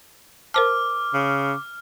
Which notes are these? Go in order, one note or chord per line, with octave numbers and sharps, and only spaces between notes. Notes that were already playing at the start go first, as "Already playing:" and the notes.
A#4 C5 A5 D6 F6
C#3